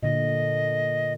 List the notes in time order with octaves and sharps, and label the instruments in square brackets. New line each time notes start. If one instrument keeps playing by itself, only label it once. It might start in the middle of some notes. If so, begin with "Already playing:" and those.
[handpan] A#2 D3 [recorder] D#5